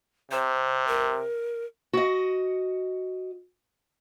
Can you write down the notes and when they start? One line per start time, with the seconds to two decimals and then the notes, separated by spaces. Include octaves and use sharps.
0.32 C3 C5
0.87 A#4
1.93 F#4 D#5